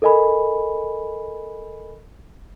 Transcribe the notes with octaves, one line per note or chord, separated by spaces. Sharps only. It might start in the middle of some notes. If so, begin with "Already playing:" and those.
A4 A#4 D#5 G#5 B5